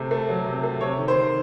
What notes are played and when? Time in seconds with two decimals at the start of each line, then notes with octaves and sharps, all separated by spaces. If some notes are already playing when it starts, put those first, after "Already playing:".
Already playing: C3 A3
0.11 A3
0.29 F#3
0.46 C3
0.63 A3
0.81 C3 C#5
0.99 D#3
1.08 C5
1.16 D#3